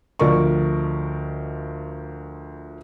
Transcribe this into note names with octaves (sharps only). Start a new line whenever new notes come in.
D2 F3 A#4 D5 D#5 C#6